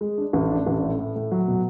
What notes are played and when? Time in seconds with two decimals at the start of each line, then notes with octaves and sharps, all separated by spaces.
0.01 G#3
0.18 D4
0.33 A1
0.50 D4
0.67 A1
0.83 A2
0.99 A2
1.16 A2
1.31 F#3
1.48 B2